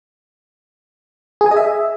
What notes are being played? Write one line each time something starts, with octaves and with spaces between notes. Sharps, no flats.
G#4
G#5
D#5
E5